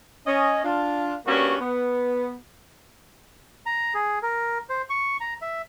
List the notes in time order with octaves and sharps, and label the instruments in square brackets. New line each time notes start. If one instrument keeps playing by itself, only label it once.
[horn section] C#4 D#5
D4 F4
G3 A#3 B3 C#4 D4 F#4
B3
[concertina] A#5
G#4
A#4
C5
C#6
A#5
E5